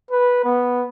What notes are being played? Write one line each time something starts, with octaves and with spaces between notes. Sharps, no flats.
B4
B3